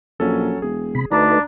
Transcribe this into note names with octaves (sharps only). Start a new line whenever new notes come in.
A#1 F#3 C#4 A4
E1 G#4
C3 B5
D2 A3 D4 D#4 B4 A#5